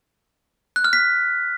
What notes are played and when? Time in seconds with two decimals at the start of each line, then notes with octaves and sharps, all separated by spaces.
0.76 F#6
0.84 F6
0.93 B6